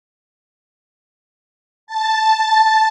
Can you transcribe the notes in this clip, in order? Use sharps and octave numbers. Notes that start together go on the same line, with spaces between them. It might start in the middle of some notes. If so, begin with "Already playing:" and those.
A5